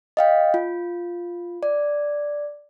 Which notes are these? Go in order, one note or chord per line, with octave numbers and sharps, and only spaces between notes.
D#5 F5 G5
F4
D5